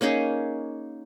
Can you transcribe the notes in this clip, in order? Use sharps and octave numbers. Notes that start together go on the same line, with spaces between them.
A#3 C#4 D#4 G#4